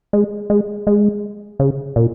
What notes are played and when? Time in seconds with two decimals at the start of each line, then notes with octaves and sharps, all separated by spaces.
0.13 G#3
0.50 G#3
0.87 G#3
1.59 C#3
1.96 A#2